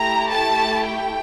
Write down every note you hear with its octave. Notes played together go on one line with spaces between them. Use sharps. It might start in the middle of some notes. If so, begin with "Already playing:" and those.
Already playing: A3 E4 G4 A#5
A5
G5